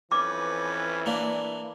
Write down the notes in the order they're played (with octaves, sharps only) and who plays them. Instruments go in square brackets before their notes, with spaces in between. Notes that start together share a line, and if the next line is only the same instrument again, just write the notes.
[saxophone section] F2 C#4 B4 [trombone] E3 [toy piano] D6
[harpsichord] A#3 D4